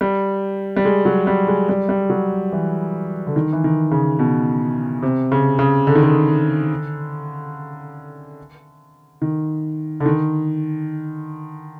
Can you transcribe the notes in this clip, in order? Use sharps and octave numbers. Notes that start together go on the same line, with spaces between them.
G3
G3
G#3
F#3
G3
G#3
G3
G3
F#3
E3
D3
D#3
E3
D#3
C#3
B2
C3
C#3
C#3
D3
D#3
D3
D#3
D3
D#3